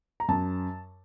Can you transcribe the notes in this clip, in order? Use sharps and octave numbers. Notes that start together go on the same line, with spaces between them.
A#5
F#2 A5